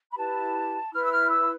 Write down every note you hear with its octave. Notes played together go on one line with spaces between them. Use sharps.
B5
E4 G4 B4 A5
E4 B4 F6
E6
F6
E6